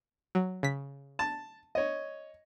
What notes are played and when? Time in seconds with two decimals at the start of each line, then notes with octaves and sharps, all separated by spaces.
0.35 F#3
0.63 C#3 B6
1.19 A5
1.75 C#5 D#5